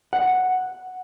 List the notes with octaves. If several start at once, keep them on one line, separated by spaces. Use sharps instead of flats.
F#5